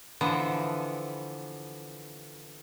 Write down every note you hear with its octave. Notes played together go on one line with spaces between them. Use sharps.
D3 E3 F3 B3